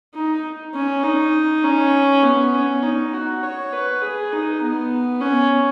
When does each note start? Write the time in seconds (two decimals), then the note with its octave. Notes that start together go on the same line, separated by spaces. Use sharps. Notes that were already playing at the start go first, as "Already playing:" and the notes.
0.15 D#4
0.75 C#4
1.04 D#4
1.64 C#4
2.23 B3
2.54 C#4
2.82 D#4
3.13 F#4
3.43 C#5
3.73 B4
4.02 G#4
4.32 D#4
4.62 B3
5.21 C#4